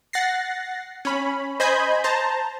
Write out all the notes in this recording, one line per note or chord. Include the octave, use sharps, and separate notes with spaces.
F#5 A6 A#6 C7
C#4 B5
C5 D#5 G#5 B5 G6 G#6
C5 A5 A#5